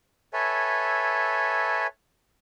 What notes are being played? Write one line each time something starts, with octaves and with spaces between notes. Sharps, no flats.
A4 B4 C#5 E5 G#5